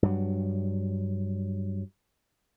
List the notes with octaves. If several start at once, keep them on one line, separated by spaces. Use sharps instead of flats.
G2 F#3